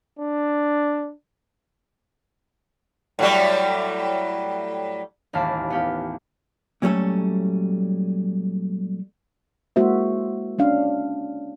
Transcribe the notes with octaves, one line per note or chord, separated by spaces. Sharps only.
D4
A2 F#3 G3
E1 A1 D#2 F5 A5 B5
B3 G4 F5
A#2 F#3 G3 A3 C#4 A4
G#3 A#3 E4 F#4 C5 E5
C#4 D4 F5